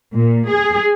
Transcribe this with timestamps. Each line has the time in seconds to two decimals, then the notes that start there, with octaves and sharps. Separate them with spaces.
0.15 A#2
0.49 G#4